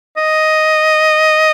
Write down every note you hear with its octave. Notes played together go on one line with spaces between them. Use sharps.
D#5